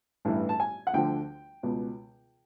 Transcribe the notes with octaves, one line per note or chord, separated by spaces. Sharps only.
A1 G2 E3
A5
G#5
F#5
D2 D3 F3 G5
C#2 B2